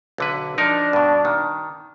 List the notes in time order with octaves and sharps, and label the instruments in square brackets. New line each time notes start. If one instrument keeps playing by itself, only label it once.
[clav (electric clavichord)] B1 D3 B4
[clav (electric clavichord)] F3 D#4 A#4 [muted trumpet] D4
[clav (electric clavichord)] G2 B2
D#3